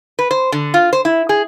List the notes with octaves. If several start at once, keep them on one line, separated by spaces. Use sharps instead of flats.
B4
C5
D3
F4
C5
E4
G#4